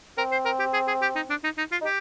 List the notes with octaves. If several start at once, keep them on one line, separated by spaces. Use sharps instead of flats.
C4 A#4
C5
A#4
G4
G#4
G#4
G4
D#4
D4
D#4
D#4
F4
D#4
G4